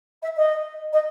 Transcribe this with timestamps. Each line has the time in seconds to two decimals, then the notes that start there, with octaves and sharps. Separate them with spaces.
0.22 E5
0.36 D#5
0.92 D#5